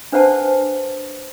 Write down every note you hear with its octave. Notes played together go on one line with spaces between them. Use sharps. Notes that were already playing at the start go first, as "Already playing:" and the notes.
D4 B4 C5 F#5 A5